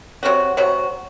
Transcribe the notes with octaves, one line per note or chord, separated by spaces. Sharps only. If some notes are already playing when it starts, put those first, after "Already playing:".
C3 F#3 C4 F#4
C3 F#3 C4 F#4